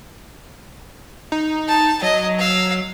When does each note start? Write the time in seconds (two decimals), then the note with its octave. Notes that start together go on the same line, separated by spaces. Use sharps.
1.32 D#4
1.67 A5
2.02 F#3 D#5
2.38 F5 E6